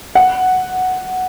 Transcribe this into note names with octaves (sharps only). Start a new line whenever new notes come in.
F#5